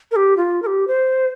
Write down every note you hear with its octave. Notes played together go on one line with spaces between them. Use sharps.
A#4
G4
F4
A#4
G4
C5